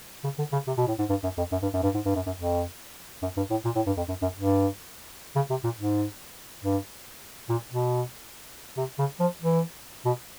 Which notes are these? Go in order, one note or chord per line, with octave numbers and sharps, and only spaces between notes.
C#3
D3
C#3
C3
B2
A2
G#2
G2
F#2
F2
F#2
G2
F#2
G2
G#2
G2
F#2
F#2
F2
F#2
G2
A2
A#2
A2
G2
F2
F#2
F#2
G2
C#3
C3
A#2
G#2
G2
A#2
B2
C3
C#3
F3
E3
B2